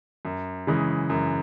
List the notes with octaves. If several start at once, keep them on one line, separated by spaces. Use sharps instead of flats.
F#2
C#3 E3 G#3
F#2